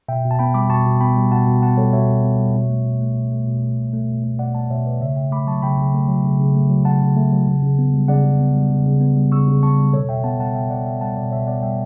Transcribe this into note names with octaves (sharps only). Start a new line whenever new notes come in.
B2 E5 G5
B2
A5
B3 G5 B5
G3 B5 D6
B2 A5 C#6
B2
B3 G5 B5
G3
B2 F#5 A5
B2
B3 F#5 A5
G3 A4 C#5
B2 C#5 E5
B2
B3
G3
B2
A3
B2
A3
B2
A3
B2
A3
B2
A3
B2
A3
B2 D5 F#5
A3 F#5 A5
B2 C#5 E5
A3 B4 D5
C#3 C#5 E5
C#3 E5 G5
A3 B5 D6
F#3 A5 C#6
C#3 G5 B5
C#3
A3
F#3
C#3
C#3
A3
F#3
C#3 F#5 A5
C#3
A3
F#3
C#3
C#3
B3
G3
C#3 D5 F#5
C#3
B3
G3
C#3
C#3
B3
G3
C#3 C#6 E6
C#3
B3 A5 C#6
G3
B2 A4 C#5
B2 E5 G5
B3 F#5 A5
G3 F#5 A5
B2 E5 G5
B2 D5 F#5
B3 E5 G5
G3 F#5 A5
B2 D5 F#5
B2 C#5 E5
B3 D5 F#5
G3 E5 G5